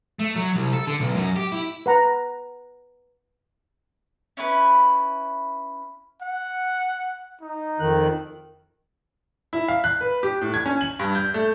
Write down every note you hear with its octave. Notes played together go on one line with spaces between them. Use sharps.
A3
F#3
C2
A4
D3
B1
F#2
G4
E4
B4 F#5 A#5
C#4 E4 B4
F#5
D#4
F2 D#3 F#6
E4
F5
F#6
B4
G4
A2
G#6
C#4
F#7
G2
G6
A3